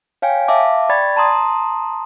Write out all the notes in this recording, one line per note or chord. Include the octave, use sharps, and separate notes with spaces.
C#5 F5 G5 G#5
E5 F5 A5 D6
D5 G5 B5 C#6 G#6 A6
A5 A#5 C6 D#6